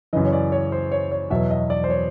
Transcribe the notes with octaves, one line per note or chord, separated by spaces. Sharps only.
F#2 C#3 E3 D#5
C#5
D5
C#5
C5
C#5
C#5
E2 B2 F#3 E5
D#5
D5
C5
C#5